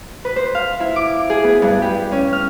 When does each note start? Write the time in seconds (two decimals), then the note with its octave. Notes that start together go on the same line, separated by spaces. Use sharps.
0.25 B4
0.36 C5
0.55 F5
0.80 E4
0.96 D6
1.30 G#4
1.44 B3
1.62 G2
1.82 G4
2.12 C#4
2.33 F6